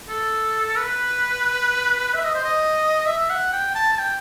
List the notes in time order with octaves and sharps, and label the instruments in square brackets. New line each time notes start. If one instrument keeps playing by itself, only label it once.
[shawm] A4
B4
E5
D#5
C5
D#5
E5
F#5
G5
A5
A5
G5